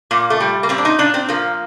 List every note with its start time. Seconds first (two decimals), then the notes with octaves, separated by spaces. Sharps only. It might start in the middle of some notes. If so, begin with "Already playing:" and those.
0.11 A#2 A#3
0.30 A3
0.40 G3
0.63 A#3
0.69 A#2 C4
0.78 D4
0.85 D#4
0.99 A#2 D4
1.14 C4
1.29 F3 A#3